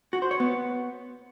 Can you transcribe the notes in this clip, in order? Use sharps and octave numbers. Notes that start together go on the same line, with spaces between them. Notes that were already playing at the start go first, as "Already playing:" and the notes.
F#4
C5
C#5
B3